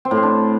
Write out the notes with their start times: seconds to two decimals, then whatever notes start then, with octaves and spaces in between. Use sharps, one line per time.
0.05 C4
0.11 A2
0.17 C4
0.23 D4